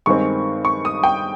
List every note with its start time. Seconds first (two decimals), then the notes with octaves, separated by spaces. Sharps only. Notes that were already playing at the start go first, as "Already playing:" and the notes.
0.06 G2 D#3 G#3 C4 C#6
0.65 C#6
0.85 D#6
1.03 G5